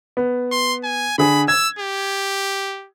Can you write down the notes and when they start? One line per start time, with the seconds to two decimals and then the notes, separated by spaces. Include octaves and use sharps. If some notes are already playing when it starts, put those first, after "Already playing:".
0.17 B3
0.52 C6
0.84 G#5
1.18 D3 G#4 B5
1.48 E6 G#6
1.79 G4